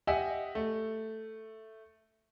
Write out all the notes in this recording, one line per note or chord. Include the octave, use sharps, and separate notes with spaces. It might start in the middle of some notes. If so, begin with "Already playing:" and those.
G4 D#5 E5 F#5 G#5
A3